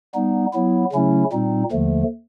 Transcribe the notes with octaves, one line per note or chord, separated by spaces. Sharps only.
G3 B3 D#4
F#3 B3 E4
C#3 F#3 A3 C#4 E4
A#2 G3 C4 D#4
D#2 D3 F3 A3